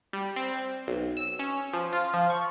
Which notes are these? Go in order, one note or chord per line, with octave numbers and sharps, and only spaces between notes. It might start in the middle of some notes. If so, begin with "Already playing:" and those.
G3
C4
B1
E6
C#4
F3
F4
F3
C#6